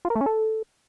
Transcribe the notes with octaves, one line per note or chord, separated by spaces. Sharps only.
F4
A#4
A3
C#4
A4